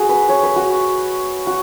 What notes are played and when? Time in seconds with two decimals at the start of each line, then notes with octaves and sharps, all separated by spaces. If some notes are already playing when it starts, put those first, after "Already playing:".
Already playing: F#4 G#4
0.09 B4
0.29 C#5
0.43 B4
0.56 F#4
1.47 F#4